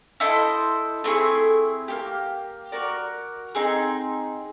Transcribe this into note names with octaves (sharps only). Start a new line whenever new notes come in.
E4 A4 C5 D#5
A3 C4 E4 G#4
A#3 D#4 G4
F#4 A#4 D5
C4 D#4 G#4